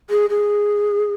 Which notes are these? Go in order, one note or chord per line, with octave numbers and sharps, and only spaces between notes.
G#4
G#4